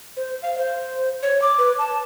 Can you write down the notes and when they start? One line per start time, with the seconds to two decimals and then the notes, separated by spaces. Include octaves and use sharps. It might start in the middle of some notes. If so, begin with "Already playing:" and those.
0.17 C5
0.42 F5
0.58 C5
1.23 C#5
1.42 D6
1.58 B4
1.79 A5